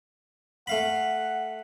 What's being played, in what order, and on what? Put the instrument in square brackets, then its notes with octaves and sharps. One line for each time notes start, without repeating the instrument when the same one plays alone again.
[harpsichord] A3 F5 B5 [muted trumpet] F#5